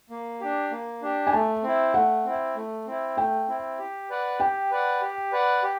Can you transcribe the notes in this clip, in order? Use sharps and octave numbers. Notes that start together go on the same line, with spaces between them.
A#3
D4 G4
A#3
D4 G4
G#5
A3 A5
C4 E4
A3 F#5
C4 E4
A3
C4 E4
A3 G5
C4 E4
G4
B4 D5 F#5
G4 G5
B4 D5 F#5
G4
B4 D5 F#5
G4